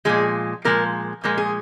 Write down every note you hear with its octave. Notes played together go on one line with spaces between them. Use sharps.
A#2 F3 G#3 G#4
A#2 F3 G#3 A#4
A#2 F3 G#3 A#4
G#4